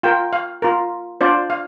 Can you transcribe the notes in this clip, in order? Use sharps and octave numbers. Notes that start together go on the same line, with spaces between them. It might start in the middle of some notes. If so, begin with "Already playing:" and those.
F4 A#4 G5
F5
F4 A#4
D4 F4 C5 D5
F5